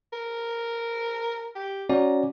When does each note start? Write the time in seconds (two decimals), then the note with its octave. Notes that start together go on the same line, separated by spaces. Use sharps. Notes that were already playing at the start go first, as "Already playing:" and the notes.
0.13 A#4
1.56 G4
1.90 C#4 F#4 D5 A#5